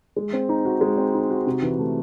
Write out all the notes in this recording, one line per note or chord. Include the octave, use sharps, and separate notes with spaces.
G#3
C4
D#4
F#4
G#3
C4
D#4
F#4
C3
E3
A3